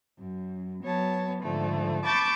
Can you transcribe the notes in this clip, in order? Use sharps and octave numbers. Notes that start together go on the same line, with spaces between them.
F#2
F#3 B3 C#5 A5
G#2 D3 F3 A3
A5 B5 C#6 D6 G6 A6